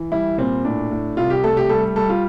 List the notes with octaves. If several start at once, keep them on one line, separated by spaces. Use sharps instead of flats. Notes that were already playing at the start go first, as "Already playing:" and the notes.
Already playing: E3
G3 E4
A#2 C4
A2 D4
A2
C2 F4
G4
A3 A4
G4
G3 A4
G3 A4
F4